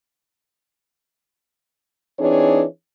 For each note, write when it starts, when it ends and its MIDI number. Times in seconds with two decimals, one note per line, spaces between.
2.19 2.64 52
2.19 2.64 60
2.19 2.64 62
2.19 2.64 63
2.19 2.64 68
2.19 2.64 73